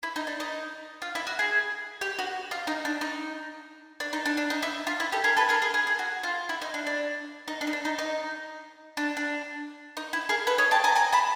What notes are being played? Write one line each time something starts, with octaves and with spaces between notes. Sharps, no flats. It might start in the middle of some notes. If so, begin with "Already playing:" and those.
E4
D#4
D4
D#4
F4
E4
F#4
G#4
G4
F#4
F4
D#4
D4
D#4
D4
D#4
D4
D4
D#4
E4
F4
E4
G4 A4
G#4 A#4
A4 B4
G#4 A#4
G#4
G#4
G#4
F#4
F4
E4
D#4
D4
D4
D#4
D4
D#4
D4
D#4
D#4
D4
D4
D#4
E4
G#4 A#4
A4 B4
C#5 D#5
G5 A5
G#5 A#5
G#5 A#5
A5 B5